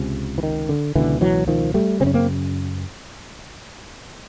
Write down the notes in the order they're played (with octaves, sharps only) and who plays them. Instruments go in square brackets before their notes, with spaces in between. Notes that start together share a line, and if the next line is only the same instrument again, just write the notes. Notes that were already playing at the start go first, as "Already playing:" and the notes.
Already playing: [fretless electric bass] C#2 C3
E3
D#3
D3
C#2 B2 D3 E3
E3 F#3
D#3 F3
G3 A3
C#3 C4
F#2 C#4
A#3 C4